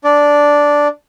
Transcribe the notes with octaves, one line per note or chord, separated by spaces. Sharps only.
D4 D5